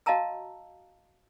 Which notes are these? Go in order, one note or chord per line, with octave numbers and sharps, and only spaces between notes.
F#4 D#5 F5 A5 A#5 E6